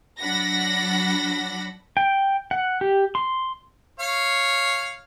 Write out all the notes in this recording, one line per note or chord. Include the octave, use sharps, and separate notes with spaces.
F#3 D4 F#5 B5 A#6
G5
F#5
G4
C6
C#5 F5